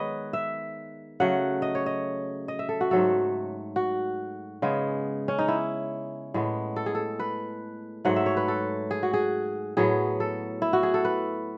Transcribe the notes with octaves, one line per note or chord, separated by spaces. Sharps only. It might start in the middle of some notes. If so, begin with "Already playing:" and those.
Already playing: D#3 G#3 B3 B4 C#5 D#5
E5
C#3 F#3 A3 F#5
D#5
C#5
D#5
D#5
E5
A4
F#4
G#2 F#3 A3 A4
F#4
C#3 G#3 B3
C#4
D#4
E4
A2 G#3 B3
A4
G#4
A4
B4
G#2 F#3 A3 F#5
E5
C#5
B4
A4
G#4
F#4
G#4
A2 F#3 B3 G#4
A4
E4
F#4
G#4
A4
B4